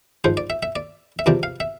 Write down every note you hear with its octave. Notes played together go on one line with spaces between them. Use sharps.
G#2 F3 C5
D5
E5
E5
D5
E5
E2 C3 F3 D5
F5
E5